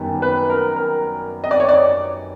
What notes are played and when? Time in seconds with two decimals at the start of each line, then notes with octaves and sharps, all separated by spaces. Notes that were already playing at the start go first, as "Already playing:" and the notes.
Already playing: F#2 D#3 G3 B3
0.22 B4
0.50 A#4
0.76 A#4
1.44 D#5
1.51 D5
1.60 C#5
1.69 D5